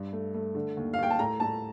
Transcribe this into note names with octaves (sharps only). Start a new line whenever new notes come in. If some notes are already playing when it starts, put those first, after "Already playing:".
Already playing: G2
A3
A3
D3
D#2
F5
D#2 G5
A5
A2 A#5
A2 A5